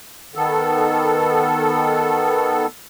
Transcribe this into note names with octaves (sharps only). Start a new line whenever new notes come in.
D#3 B3 A4